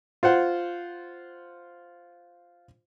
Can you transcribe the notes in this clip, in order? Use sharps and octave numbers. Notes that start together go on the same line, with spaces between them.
F4 C5 F#5